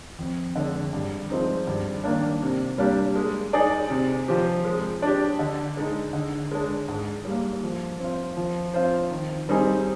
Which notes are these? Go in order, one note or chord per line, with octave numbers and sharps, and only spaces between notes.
F2
D3 G#3 D4
G2
F3 G#3 C4 D#4
G2
D#3 A#3 D4
C3
G3 A#3 D4 G4
G#3
D#4 G#4 D5
C3
F3 C4 G4
G#3
D4 G4
D3
G#3 D#4
D3
G#3 D4
G#2
G3
A#3
F3
C4 F4
F3
C4 F4 C5
D#3
G3 C4 D#4 G#4